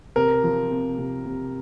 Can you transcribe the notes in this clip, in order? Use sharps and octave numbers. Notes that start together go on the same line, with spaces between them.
C3 A#4
F3
C3
C3
C3